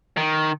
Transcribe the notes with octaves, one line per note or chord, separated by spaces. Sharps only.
D#3